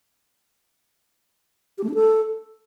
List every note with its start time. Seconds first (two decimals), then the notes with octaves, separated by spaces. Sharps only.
1.78 G4
1.83 A3
1.89 D4
1.94 A4